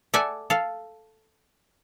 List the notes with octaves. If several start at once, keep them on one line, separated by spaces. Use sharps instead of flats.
A4 D5 E5 F#5 G#5
A4 F5